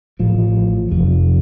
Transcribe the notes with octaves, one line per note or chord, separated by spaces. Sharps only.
A1 A2 F3
F1 F2 F3